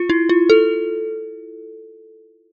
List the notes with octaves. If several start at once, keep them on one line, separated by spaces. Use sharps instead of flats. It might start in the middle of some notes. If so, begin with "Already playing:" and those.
Already playing: F4
E4
F4
A4